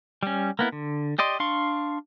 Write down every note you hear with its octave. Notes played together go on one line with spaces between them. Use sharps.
G3 C#4
A#3 B3 E4
D3
G4 D5 D#5 C6
D4 F5 C6 C#6